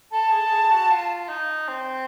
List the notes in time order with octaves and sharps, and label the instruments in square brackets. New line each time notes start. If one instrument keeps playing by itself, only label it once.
[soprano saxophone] A4 [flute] A5
[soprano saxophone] G#4
A4
G#4
F#4
F4
D#4
C4